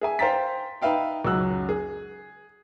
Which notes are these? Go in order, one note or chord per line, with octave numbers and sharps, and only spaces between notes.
G#4 E5 G#5
C5 F5 G5 A#5 A6 B6
D#4 B4 E5 F5 G5
C#2 F#2 F#3 E6 F#6
G#4